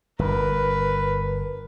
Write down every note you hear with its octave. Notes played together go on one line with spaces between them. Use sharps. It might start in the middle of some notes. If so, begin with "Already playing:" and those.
G1 G2 A#4 B4